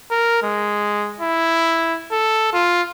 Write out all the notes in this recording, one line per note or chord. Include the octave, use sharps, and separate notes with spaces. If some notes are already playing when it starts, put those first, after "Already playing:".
A#4
G#3
E4
A4
F4